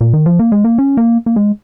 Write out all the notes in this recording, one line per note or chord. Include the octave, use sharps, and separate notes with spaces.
A#2
D#3
F3
A#3
G#3
A#3
C#4
A#3
A#3
G#3